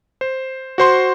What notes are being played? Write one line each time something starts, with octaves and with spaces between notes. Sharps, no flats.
C5
F#4 C5 C6